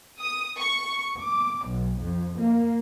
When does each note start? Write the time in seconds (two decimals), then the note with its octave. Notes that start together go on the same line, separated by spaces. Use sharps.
0.20 D#6
0.59 C#6
1.20 D6
1.68 B1
2.02 F2
2.42 A#3